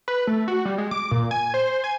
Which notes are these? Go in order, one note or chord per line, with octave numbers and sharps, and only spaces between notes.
B4
A3
F#4
G3
G#3
D6
A#2
G#5
C5
G#5